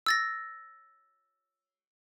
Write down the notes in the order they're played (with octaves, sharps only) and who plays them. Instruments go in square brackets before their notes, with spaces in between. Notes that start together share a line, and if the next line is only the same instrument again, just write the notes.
[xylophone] E6 A6 A#6